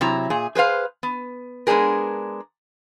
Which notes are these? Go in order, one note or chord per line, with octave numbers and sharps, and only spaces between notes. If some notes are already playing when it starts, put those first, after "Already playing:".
C3 F#3 E4 A#5
A#2 G#4
G#4 B4 C5 F5
B3
G#3 B3 C#4 D4 G#4 A#4